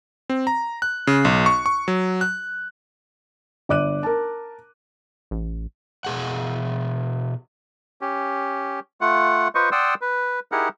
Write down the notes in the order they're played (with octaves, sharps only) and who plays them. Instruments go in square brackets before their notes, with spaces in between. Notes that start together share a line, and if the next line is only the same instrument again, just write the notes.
[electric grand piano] C4
A#5
F#6
C#3
B1
C#6
C#6
F#3
F#6
[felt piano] G1 D5 D6 F#6 D#7
A#4 A5
[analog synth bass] A1
[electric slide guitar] B2 G#4 F#5
[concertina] C#4 G4
A3 F4 F#5
F4 B4 C5 D#5 C#6
D5 F#5 G5 C6 D#6 E6
B4
D#4 E4 G4 G#4 A#4 F#5